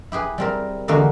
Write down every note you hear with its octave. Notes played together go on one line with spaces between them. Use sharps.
E4 G4 G#4 B4
G3 C4 A#4
E2 D3 G#3 A#3 F#4 E5